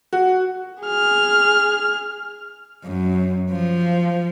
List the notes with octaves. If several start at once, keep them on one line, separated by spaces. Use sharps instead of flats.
F#4
G#4 F6
F#2
F3